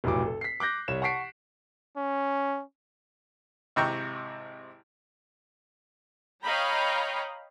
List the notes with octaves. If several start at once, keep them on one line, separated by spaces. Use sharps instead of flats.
F1 B1 A2 F#4 D6
A4
B6 C7
D6 F#6 G6 A#6
C2 C#5 E7
F#5 A5 C#6 B6 C7 D7
C#4
G#1 C3 E4 G5 A#5 C#6
C#5 D#5 F5 G5 A#5 B5